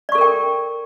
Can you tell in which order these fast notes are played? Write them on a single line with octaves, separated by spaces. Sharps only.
D5 C#6 A4 A#4 G5